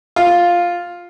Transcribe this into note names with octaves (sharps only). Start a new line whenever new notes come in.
F4